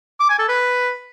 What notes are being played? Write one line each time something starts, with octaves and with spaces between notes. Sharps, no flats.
D6
G#5
A4
B4